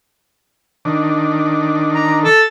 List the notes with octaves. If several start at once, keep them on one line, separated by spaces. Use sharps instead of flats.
D#3 D4
A#5
A4